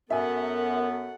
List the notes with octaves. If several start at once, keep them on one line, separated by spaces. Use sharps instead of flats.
F#2 B3 A4 A#4 E5 F#5 G#5